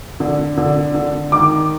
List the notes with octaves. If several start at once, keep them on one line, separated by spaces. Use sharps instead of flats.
D3
D3
D3
D#3 D6